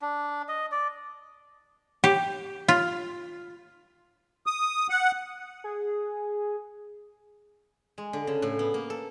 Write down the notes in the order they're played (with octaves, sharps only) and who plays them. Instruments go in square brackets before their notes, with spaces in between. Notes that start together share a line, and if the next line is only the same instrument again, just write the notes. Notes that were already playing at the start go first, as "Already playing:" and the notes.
[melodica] D4
D#5
D5
[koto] G4
F4
[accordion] D#6
F#5
[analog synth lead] G#4
[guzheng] G#3
D3
C#3
A2
B3
A#3
A4